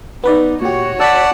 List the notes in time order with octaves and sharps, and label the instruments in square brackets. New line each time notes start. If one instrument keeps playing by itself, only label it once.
[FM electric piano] B3 B4 D5 [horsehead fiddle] D#4
[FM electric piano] A#2 G4 [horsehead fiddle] F#4 C#5
[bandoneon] D5 F#5 A5 [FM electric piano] E6 F#6 B6